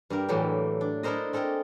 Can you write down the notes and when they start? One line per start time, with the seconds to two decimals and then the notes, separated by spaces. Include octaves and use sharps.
0.10 G2 G4 A#4
0.28 A2 E3 F#3 A#3 D4 G4
0.81 D4
1.03 D4 E4 A4 A#4 C5 D#5
1.33 C4 A4 A#4 D#5 G#5